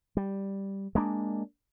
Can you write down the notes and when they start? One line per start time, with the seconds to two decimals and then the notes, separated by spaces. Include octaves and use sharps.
0.17 G3
0.95 G#3 A#3 D4